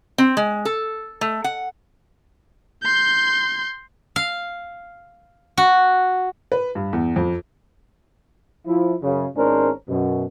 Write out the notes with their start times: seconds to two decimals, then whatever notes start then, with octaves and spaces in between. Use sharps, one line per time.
0.18 C4
0.37 G#3
0.65 A4
1.21 A3
1.44 F#5
2.83 C6 G6
4.16 F5
5.58 F#4
6.52 B4
6.75 G2
6.93 E2
7.16 F2
8.67 F3 E4
9.02 F#2 C#3
9.36 G#1 G#2 C#4 D4 A#4 C5
9.89 F#2 B2